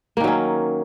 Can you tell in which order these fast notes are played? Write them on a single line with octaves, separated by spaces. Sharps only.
A#3 D#3 F#3 C#4